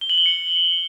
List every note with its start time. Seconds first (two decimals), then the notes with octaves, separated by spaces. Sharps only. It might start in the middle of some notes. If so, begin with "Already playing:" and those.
0.01 G7
0.10 F#7
0.18 G7
0.26 C#7